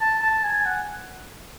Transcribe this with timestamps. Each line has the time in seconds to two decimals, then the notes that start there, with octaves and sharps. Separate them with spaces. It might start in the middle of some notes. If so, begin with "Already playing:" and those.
0.01 A5
0.22 A5
0.44 G#5
0.65 F#5